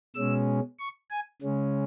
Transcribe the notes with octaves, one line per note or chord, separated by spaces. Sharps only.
B2 G#3 C#4 E6
C#6
G#5
C#3 G#3 C#4